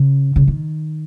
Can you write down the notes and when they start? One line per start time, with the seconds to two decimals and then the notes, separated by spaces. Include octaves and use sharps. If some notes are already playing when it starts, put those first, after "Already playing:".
Already playing: C#3
0.36 C#3
0.48 D#3